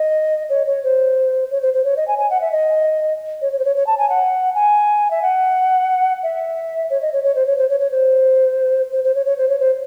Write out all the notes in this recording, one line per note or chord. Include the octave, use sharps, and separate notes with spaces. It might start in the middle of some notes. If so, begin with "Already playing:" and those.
Already playing: D#5
C#5
C#5
C5
C#5
C5
C5
C#5
D#5
G#5
G#5
F#5
E5
D#5
C#5
C#5
C5
C#5
C#5
A5
G#5
F#5
G#5
E5
F#5
E5
C#5
D#5
C#5
C#5
C5
C#5
C5
C#5
C#5
C5
C5
C5
C#5
C#5
C5
C#5
C5